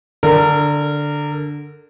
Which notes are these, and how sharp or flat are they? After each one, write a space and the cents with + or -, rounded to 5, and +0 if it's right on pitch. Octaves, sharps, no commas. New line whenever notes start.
D3 +0 A#4 -20